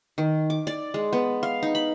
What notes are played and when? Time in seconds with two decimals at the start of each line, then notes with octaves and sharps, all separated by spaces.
0.18 D#3
0.50 D6
0.67 D5
0.94 G#3
1.13 B3
1.43 F5
1.63 D#4
1.75 B5